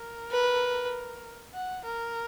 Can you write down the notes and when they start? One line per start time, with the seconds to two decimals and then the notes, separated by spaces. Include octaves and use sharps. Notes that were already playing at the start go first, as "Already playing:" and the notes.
Already playing: A#4
0.31 B4
1.55 F#5
1.85 A#4